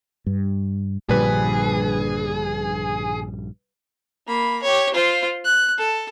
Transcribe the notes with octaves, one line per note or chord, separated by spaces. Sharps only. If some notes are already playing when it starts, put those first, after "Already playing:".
G2
A#1 G2 A#2 D3 F3 G3 G#4 B4
A#3 B5
G4 C#5
F4 C5
F#6
A4